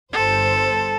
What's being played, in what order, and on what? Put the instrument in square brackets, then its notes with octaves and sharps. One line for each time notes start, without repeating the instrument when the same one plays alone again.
[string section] G1 C5 [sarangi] A4